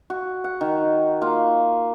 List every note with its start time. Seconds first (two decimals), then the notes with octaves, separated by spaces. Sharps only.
0.10 F#4
0.44 F#5
0.61 D#3
1.21 A#3 F4